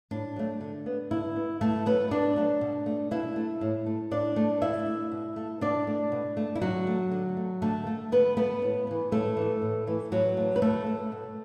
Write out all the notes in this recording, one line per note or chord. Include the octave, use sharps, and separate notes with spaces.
A2 D4
F#3 A3
D3
B3
D3 E4
B3
B2 A3 A4
F#3 A3 B3 B4
B2 D4 D5
F#3 A3
B2
A3
B2 E4 E5
A3
A2
A3
A2 D4 D5
A3
B2 E4 E5
A3
B2
A3
B2 D4 D5
A3
B2
A3
E4
D3 F#3 F#4
A3
D3
A3
D3 A3 A4
A3
D3 B3 B4
A3 B3 B4
A2
E3 B3
A2 A3 A4
E3 B3
A2
E3 A3
A2 F#3 F#4
E3 A3
B4
B2 A3 A4
A3
B2